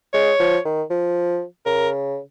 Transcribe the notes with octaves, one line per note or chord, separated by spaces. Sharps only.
G#3 C#5
F3
D#3
F3
C#3 A#4